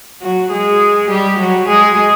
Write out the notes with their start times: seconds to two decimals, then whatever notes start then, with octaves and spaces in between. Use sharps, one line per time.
0.22 F#3 F#4
0.51 G#3 G#4
1.10 G3 G4
1.38 F#3 F#4
1.68 G#3 G#4